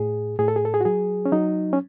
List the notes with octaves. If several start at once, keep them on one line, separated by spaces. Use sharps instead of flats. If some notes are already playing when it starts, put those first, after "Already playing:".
Already playing: A2 G#4
A2 G#4
A4
G#4
A4
G#4
F#4
F#3 G#4
C#4
F#3 D#4
C#4